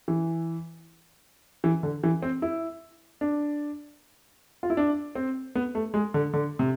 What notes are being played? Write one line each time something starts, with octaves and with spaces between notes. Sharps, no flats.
E3
E3
D3
E3
C4
E4
D4
F4
E4
D4
C4
B3
A3
G#3
D3
D3
C3